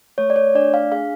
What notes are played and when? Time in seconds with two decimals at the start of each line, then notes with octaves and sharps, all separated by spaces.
0.18 A3 C#5
0.30 D5
0.36 C#5
0.55 D4 D5
0.74 F5
0.92 G#4 F5